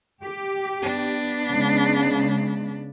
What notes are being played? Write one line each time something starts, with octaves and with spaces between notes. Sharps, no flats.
G4
B3 D4
C#3 G#3